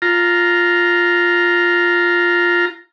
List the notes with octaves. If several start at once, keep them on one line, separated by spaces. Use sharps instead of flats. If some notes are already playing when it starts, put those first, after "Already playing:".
F4 A#5